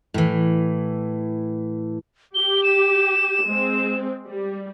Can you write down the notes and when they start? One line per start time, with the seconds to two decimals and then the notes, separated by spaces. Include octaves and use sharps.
0.14 A2 E3
2.35 G4 G7
2.63 E7
3.45 G#3 C4
4.26 G3